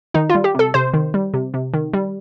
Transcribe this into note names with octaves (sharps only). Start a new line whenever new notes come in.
D#3 D#4
F4
G3
G4
C3 A4
C3 C5
D#3
G3
C3
C3
D#3
G3